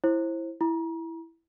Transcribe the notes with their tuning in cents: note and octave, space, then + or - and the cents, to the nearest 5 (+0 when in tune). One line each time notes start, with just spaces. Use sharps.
E4 +5 C5 +25
E4 +0 A#5 +35